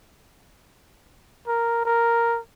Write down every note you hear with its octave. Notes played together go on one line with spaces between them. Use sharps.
A#4
A#4